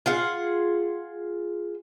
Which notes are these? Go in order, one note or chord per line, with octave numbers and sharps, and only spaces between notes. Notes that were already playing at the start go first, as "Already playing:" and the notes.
F4 G#4 F#5